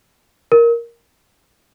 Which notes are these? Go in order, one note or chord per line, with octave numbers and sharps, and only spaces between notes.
A#4